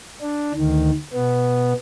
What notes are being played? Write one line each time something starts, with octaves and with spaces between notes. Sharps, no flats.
D4
D2 D#3
B2 B3